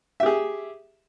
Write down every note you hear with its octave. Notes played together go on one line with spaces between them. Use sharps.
G4 G#4 E5